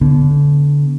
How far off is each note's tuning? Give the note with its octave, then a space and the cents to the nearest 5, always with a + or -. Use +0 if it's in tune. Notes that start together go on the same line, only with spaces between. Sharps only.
D3 -25 B3 +0